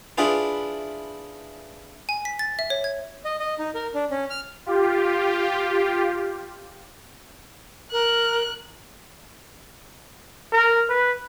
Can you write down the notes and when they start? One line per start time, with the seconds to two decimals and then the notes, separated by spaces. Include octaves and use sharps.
0.18 D4 E4 F4 G#4 B4
2.09 G#5
2.25 B6
2.39 A6
2.59 E5
2.70 C#5
2.84 G#6
3.25 D#5
3.40 D#5
3.59 D#4
3.75 A#4
3.94 D4
4.11 C#4
4.30 F6
4.66 F4 G4
7.92 A#4 F#6
10.53 A#4
10.89 B4